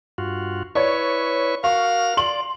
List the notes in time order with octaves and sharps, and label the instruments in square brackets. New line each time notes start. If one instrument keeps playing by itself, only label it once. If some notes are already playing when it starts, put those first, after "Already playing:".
[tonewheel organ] G2 F4 F#4
[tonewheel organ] E4 B4 C#6 [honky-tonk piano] C#5 D5
[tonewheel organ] F#4 A#4 [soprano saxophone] F5 [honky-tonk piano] C#6
[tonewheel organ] D5 [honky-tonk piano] C6 F#7